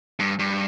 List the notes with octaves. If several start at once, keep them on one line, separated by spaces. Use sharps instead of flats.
G2
G2